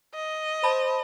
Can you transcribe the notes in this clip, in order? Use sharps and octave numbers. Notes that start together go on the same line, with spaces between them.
D#5
C5 A5 B5